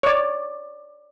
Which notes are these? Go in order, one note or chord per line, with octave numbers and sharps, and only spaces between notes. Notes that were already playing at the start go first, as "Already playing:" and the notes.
C#5 D5